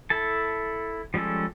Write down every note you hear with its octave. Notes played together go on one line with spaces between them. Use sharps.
E4 A4 A5
F3 G3 G#3 C#4 A4